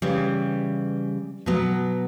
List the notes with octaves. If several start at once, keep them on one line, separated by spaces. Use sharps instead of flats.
C#3 E3 G3
B2 F#3 B3